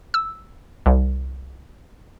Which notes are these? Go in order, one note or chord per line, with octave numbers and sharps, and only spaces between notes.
E6
C2